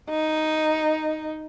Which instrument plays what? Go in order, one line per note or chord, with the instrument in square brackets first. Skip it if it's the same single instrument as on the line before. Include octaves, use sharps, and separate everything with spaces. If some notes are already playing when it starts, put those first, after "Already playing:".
[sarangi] D#4